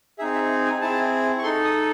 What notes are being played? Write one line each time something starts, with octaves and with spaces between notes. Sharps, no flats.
C4 D#4 G#4 E5
E5
G#5
C4 E4 G#4 A5
C#6
D#4 A4 C6
D#6